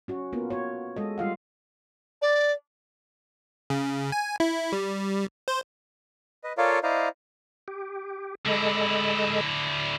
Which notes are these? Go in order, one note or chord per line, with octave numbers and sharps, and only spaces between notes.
C#4 F#4
A#3 B3 F4
F#4 C#5
G#3 A4 D#5
G3 F4 F5 F#5
D5
C#3
G#5
E4
G3
C5
B4 D#5
F4 A4 A#4 C#5 D5 F5
E4 C5 D5 D#5 F5 A#5
G4
D3 G#3 E4 A4 D#5